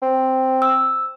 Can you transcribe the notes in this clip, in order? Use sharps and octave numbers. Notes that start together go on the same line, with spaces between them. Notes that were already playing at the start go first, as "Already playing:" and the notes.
C4
E6